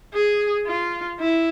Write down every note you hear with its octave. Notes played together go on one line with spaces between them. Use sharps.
G#4
F4
E4